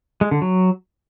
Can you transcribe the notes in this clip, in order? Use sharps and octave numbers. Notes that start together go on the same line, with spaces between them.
G#3
D3
F#3